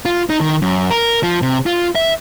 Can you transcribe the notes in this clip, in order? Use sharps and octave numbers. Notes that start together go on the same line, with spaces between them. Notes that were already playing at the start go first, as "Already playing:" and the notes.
F4
D#4
D#3
F#2
A#4
F3
C3
F4
E5